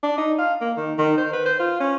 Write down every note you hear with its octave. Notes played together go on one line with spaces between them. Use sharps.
D4
D#4
F5
A#3
D#3
D#3
C5
B4
C5
F4
C#4